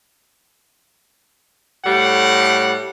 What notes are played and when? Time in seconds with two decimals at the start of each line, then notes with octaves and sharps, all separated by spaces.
1.85 A2 G3 F#5